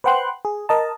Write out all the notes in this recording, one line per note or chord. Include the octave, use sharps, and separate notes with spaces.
B4 C5 F#5 G5 C6 F#6
G#4
A#4 D#5 A5